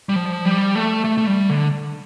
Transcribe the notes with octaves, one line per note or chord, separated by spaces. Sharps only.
G3
F3
G3
A3
A3
A3
G3
D3